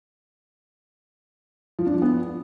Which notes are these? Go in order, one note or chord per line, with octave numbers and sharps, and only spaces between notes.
F3
D4
F3
B3